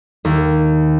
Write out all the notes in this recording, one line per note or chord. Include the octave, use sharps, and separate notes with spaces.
D#2